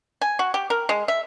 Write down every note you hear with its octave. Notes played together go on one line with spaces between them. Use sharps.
G#5
F#4
G4
A#4
G#3
E5